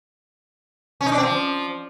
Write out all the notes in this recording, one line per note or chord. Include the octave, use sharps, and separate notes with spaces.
C#4
D#4
D4
C4
F3